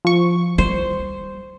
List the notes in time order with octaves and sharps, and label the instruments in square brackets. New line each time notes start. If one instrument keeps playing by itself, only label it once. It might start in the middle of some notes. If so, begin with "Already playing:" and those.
[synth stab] F3 C#6
[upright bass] G3 [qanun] C5